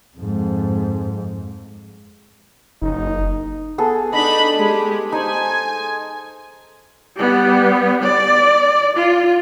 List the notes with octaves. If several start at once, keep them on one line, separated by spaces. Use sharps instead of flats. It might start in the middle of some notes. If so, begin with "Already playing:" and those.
F2 G#2
F#1 D#4
B3 G#4 A4
D4 D#4 D#5 B5
G#3 G4
D#4 C5 G#5
G3 B3
D5
F4